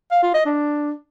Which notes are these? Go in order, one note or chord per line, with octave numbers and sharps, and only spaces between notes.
F5
F4
D#5
D4